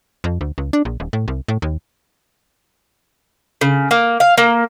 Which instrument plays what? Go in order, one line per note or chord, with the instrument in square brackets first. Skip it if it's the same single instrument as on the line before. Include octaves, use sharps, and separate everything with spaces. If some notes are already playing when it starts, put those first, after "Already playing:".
[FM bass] F2
D2
C#2
D4
A#1
D#1
A2
C2
A2
D#2
[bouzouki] C#3
A#3
F5
A#3